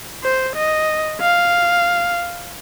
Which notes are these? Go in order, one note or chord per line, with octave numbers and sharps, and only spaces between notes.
C5
D#5
F5